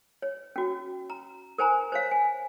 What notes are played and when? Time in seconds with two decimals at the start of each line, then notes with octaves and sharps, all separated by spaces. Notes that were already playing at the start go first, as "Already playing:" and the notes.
0.22 C#5
0.56 C#4 F#4
1.10 A#5
1.58 A#4 C5 G#5 A#5
1.92 C5 C#5 F5
2.11 G#5